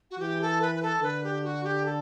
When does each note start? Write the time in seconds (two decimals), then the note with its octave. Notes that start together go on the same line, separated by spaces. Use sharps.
0.10 F#4
0.19 E3 G4
0.41 A4
0.61 B4
0.75 B4
0.82 A4
1.02 D3 B4
1.23 G4
1.44 F#4
1.64 G4
1.85 A4